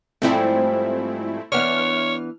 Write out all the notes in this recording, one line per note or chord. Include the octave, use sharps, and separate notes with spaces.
G#2 F3 G3 A3 C4 E4
E3 B3 D4 C#5 F6